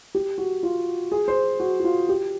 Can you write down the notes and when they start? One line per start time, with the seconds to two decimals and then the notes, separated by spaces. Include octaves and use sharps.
0.15 G4
0.38 F#4
0.63 F4
1.12 G#4
1.28 C5
1.60 F#4
1.80 F#4
1.84 F4
2.09 G4